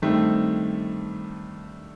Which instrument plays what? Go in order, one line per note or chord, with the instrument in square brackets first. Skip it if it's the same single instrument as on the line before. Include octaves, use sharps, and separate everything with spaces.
[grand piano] G2 D#3 A3 C4